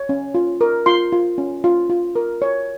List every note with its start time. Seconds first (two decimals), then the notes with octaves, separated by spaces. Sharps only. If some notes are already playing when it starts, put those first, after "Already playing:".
Already playing: C#5
0.09 C#4
0.35 F4
0.61 A#4
0.86 F4 C6
1.12 F4
1.38 C#4
1.64 F4
1.90 F4
2.16 A#4
2.42 C#5